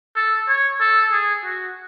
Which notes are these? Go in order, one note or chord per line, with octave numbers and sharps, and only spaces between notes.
A4
C#5
A4
G#4
F#4